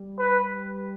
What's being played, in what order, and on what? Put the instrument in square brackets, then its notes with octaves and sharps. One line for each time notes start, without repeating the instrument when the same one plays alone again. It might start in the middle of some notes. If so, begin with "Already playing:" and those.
Already playing: [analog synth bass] G3
[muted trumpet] B4